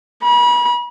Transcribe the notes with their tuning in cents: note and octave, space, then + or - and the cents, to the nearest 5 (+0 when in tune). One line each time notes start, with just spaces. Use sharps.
B5 -35